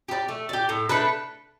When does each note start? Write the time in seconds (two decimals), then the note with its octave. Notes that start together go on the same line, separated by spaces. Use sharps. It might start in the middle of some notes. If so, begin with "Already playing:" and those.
0.08 G4 B4 D5
0.28 A3
0.49 G4 D5
0.69 A2
0.89 A3 D4 B4